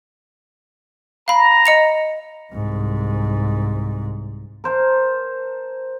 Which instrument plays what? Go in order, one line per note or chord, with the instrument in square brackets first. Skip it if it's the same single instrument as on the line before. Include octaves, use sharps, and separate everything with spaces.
[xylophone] F5 B5 [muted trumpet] A#5
[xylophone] D#5 C#7 F7
[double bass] C2 G#2
[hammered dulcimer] A#4 C5 A5